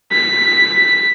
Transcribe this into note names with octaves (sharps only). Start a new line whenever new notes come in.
B6